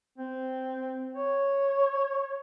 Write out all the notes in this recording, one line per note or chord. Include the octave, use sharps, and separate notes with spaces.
C4
C#5